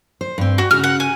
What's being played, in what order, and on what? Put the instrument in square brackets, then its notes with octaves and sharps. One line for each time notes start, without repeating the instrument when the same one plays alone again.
[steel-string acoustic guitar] C5
G2 C4
[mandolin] F#4
[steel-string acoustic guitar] C#3 F#4 [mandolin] F6
[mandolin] F#5
G#5